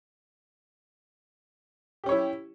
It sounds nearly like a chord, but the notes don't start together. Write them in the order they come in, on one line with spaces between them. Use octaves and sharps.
G4 C#4 C#5 E4